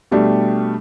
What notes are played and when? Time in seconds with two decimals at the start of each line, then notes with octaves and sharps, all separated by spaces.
0.11 B2 G3 A3 D4 G4